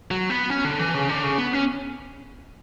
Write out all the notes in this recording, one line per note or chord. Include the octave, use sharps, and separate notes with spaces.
F#3
B3
C#4
D3
E3
C#3
D3
C#3
B3
C#4